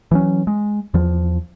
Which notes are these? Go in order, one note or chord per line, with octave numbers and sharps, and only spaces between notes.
E3 F#3 C#4
G#3
E2 F3